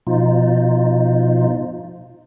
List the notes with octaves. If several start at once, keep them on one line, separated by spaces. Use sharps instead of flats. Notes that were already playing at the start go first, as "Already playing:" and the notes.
B2 F3 D#4 F4